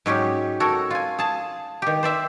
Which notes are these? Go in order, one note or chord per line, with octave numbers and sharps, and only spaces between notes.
G#2 F#3 C#4 G4
F#4 A4 A#4 C#5
F4 G#5
G#4 A5
D#3 G4
C5 D5 E5